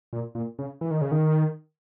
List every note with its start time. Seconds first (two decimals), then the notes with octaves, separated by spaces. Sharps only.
0.13 A#2
0.35 A#2
0.59 C#3
0.81 E3
0.91 D#3
1.01 C#3
1.12 D#3